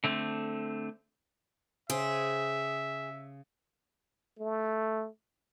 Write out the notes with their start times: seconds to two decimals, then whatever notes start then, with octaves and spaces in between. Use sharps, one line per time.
0.04 D3 A3 C4
1.90 C#3 G#4 C5 E5 G5
4.39 A3